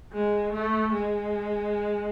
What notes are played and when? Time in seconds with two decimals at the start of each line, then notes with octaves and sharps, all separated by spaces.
0.13 G#3
0.53 A3
0.93 G#3